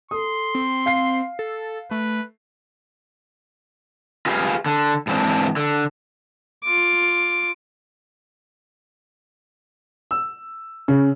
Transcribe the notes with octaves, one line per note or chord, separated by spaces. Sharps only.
A4 C6 D#6
C4
F5 C7
A4
A3 B4
F4 G4 G#4 B4 E5 F5
D3
G#2 E3 C4 D4
D3
F4 D6
E6
C#3